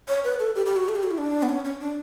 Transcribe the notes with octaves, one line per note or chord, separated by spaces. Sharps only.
C#5
B4
A4
G4
G4
F#4
A4
G4
F#4
E4
D4
B3
C#4
C#4
D4